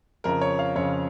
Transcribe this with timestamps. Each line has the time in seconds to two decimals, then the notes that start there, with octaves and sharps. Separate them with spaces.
0.24 F2 C#3 A#4
0.41 C#5
0.59 F5
0.76 F2 C#3 C#5